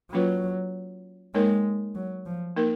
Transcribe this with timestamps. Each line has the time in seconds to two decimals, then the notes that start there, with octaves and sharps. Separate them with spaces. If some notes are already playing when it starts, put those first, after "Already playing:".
0.12 F#3 A#3 C#4 F4 B4
1.34 G#3 A#3 D#4 A#4 C#5
1.95 F#3
2.26 F3
2.56 A#3 D#4 A#4